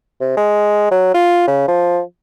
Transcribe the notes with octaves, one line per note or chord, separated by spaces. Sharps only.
C3
G#3
F#3
F4
C#3
F3